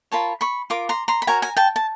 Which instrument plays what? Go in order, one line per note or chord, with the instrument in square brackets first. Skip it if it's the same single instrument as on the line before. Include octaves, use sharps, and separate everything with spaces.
[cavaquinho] F4 A#4 C#5 A5 B5
B5 C#6
F4 A#4 D6
A#5 C6
A#5 C6
B5
F#4 A#4 C#5 G#5 A#5
G#5 A#5
G5 A5
A5